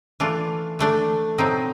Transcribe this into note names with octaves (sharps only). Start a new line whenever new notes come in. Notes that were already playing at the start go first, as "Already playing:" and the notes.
E3 A3 D4 F4
E3 A3 D4
B2 F#3 A3 C4 D#4